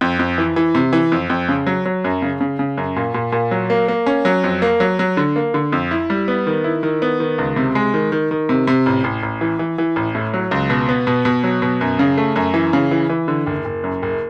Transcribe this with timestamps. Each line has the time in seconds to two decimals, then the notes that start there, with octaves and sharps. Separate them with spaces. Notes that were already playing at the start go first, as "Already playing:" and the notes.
0.01 F2
0.19 F2
0.38 E3
0.56 E3
0.75 C3
0.93 E3
1.12 F2
1.30 F2
1.49 C#3
1.67 F#3
1.85 F#3
2.04 F#2
2.22 C#3
2.40 C#3
2.59 C#3
2.77 F#2
2.96 A#2
3.14 A#2
3.32 A#2
3.51 F#3
3.70 A#3
3.88 A#3
4.06 C#4
4.25 F#3
4.44 F2
4.62 A#3
4.80 F#3
4.99 F#3
5.17 D3
5.36 A#3
5.54 D3
5.72 F2
5.91 E4
6.10 G3
6.28 B3
6.47 D#3
6.64 E4
6.83 D#3
7.02 B3
7.20 D#3
7.38 C#2
7.56 C3
7.75 G#3
7.94 D#3
8.12 D#3
8.31 D#3
8.49 C3
8.67 C3
8.86 A1
9.04 A1
9.23 A1
9.41 E3
9.59 E3
9.78 E3
9.96 A1
10.15 A2
10.34 F#3
10.51 C#2
10.70 B2
10.89 B3
11.07 B2
11.25 B2
11.44 F#3
11.62 B2
11.81 F#2
11.99 C#3
12.17 A3
12.36 F#2
12.54 E3
12.73 C#3
12.91 E3
13.10 E3
13.28 D3
13.47 F#1
13.65 F#1
13.84 F#2
14.02 F#1